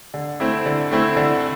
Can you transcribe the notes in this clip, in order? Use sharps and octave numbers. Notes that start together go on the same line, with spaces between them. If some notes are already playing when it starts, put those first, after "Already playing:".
D3
A3 C4 E4
D3
A3 C4 E4
D3